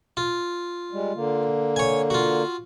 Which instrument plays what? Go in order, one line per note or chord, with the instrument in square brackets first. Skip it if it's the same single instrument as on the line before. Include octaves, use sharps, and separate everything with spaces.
[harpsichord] F4
[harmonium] G3 G#3
D3 A#3
[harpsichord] C#5 G#5
F4 F#4